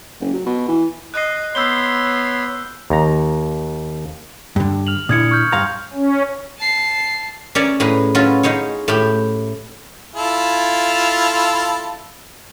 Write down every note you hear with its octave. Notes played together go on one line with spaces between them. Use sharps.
F#1
F#3
B2
E3
D#5 F#6 C7
B3 C#5 B5 C6 E6 G6 G7
D#2 A#5
G2 D3
F6 F7 F#7
A#2 D3 E4 D#6 G#6 C#7
C#6 F6 G6
G2 F5 A#5 C6
C#4
A5 C7
C#4 C#5 D5 E5 G#5 A#5
A2 G#4 B4 A#5
F#3 C#4 F4 F#4 B4
C#4 D#4 G#4 C#5
A2 A3 G4 E5 B5
E4 F4 A4